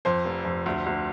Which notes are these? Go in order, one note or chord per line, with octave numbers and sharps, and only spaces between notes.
F2 C5
F1
F2
D2
D2